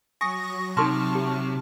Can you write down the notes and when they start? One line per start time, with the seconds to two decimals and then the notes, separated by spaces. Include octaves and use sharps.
0.21 F#3 G#5 C#6 D#6 A#6
0.77 C3 D#4 A4 A5 C6 C#6 F6
1.15 G4